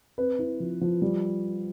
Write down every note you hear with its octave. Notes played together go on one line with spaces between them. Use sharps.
C4 B4
E4
F3
F3
G3